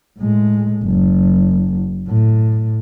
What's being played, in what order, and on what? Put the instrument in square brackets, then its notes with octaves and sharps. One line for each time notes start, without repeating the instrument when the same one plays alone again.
[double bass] A2 G#3
F#1
A2